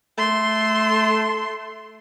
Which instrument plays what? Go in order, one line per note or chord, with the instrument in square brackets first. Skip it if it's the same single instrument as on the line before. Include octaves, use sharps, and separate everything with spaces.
[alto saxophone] A3 [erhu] C6